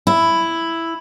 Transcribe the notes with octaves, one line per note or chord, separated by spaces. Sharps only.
E4